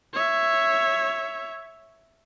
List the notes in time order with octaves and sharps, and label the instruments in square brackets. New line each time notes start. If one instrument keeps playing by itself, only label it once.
[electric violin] C#5 E5